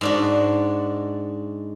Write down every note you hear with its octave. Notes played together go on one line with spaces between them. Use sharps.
G#2 D4 F#4